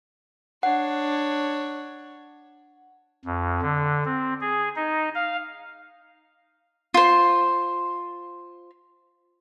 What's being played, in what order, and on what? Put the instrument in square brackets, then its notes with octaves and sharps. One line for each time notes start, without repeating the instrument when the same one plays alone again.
[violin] D4 C#5 [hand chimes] F#5
[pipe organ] F2
D3
C4
G#4
D#4
F5
[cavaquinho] F4 C5